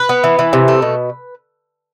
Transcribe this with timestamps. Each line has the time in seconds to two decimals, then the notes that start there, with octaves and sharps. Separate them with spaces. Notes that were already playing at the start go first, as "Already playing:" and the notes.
Already playing: B4
0.09 B3
0.24 E3
0.39 E3
0.53 C3
0.68 A3
0.82 B2